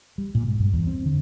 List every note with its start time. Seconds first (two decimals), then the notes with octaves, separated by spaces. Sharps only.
0.18 G3
0.35 A#2
0.48 G#2
0.60 G2
0.73 E2
0.87 C4
1.06 D3